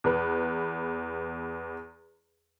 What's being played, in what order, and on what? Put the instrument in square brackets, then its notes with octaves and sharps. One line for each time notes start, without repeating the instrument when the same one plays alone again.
[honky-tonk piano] E2 B4